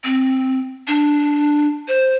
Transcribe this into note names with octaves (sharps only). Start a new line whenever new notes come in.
C4
D4
C5